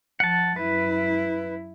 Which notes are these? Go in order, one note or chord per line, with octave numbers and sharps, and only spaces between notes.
F3 F#5 A5
F#2 E4 B4